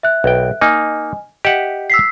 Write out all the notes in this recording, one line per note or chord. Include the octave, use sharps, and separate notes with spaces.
E5 F#6
B1 G5
A#3 D#4 D#5 G#5
G4 D#5 E5 F#5
E6 B6 C7